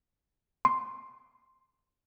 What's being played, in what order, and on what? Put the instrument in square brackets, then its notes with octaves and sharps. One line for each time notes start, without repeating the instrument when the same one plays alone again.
[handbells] C6